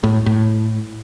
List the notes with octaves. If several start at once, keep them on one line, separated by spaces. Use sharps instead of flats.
A2
A2